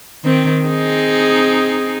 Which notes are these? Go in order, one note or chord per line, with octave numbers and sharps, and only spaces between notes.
D#3 C4
C4 D#4 G#4